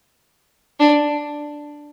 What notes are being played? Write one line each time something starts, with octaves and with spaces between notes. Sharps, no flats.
D4